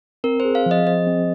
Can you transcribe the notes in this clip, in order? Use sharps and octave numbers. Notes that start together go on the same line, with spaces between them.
C4 A#4
C5
G#4
F5
F3 D#5
C5 D#5
C4